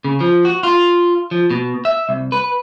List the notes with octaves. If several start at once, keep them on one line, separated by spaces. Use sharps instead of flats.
C#3
F3
F#4
F4
F3
B2
E5
C2
B4